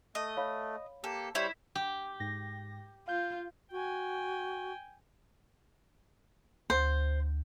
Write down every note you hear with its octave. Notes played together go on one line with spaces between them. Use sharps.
A3 D#5
C#5 F5 B5
A#3 G4 A4
G3 E4 C5 C#5
G4
G#2 A#6
F4 F5 G6
F#4 G5 G#5
D2 C5